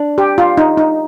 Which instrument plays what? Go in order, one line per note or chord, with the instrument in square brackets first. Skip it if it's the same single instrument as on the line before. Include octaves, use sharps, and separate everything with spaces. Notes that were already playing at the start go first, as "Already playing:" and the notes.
Already playing: [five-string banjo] D4 D5
[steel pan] G4
F4
D#4
D#4